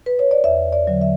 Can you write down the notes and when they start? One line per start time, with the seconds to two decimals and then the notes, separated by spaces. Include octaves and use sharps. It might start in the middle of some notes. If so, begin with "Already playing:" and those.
0.06 B4
0.19 C#5
0.31 D5
0.44 E2 E5
0.72 D5
0.87 D3 F#3
1.01 E5